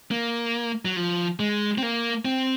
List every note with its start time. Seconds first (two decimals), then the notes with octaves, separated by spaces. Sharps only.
0.11 A#3
0.85 F#3
0.96 F3
1.40 G#3
1.78 C4
1.83 A#3
2.25 C4